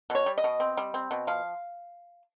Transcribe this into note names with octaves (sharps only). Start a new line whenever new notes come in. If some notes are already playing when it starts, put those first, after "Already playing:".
B2 C#5
G3
D#5
B2
C4
G3
C4
B2
F3 F5